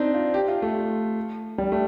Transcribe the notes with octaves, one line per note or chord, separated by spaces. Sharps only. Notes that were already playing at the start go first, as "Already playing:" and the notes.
Already playing: C4 D4 D#4
F4
G4
F4
A3
G3
A3